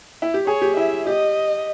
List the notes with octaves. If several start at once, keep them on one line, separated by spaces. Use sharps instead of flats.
E4
G4
G#4 C#5
G4
E4 E5
G4 D#5